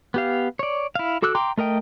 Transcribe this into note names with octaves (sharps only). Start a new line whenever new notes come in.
B3 G4 F5
C#5 D5
E4 F5
F#4 A4 D6 E6 F#6
G5 A#5 C6 D6
A3 A#4 D#5 G5